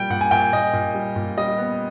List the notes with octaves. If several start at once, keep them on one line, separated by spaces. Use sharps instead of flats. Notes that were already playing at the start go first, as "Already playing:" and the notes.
Already playing: A#2 G3 G5
A#2 F#5
G#5
A#2 G5
A#2 D#5
A#2
G3
A#2
G3 D#5
B3